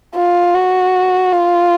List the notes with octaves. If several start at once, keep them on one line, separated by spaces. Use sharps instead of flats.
F4
F#4
F4